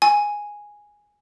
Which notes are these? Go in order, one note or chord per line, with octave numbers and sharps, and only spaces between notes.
G#5